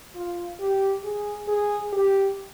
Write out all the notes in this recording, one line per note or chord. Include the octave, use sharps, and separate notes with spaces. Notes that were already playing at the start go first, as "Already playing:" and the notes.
F4
G4
G#4
G#4
G4